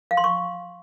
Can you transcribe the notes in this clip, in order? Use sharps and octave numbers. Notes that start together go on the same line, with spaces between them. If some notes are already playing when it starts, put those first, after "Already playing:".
F5
C6
C#6